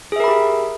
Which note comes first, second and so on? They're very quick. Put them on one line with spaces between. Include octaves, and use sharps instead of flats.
G#4 E5 A#4 B5 G4